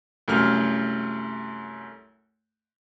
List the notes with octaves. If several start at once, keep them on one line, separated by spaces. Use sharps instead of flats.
C2 F#2 A3 F6